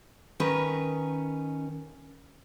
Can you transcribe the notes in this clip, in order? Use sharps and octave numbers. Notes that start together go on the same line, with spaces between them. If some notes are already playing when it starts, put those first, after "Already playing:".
D#3 C#4 A#4 B4